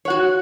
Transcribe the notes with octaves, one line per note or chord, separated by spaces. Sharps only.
F#4 C#5 F#5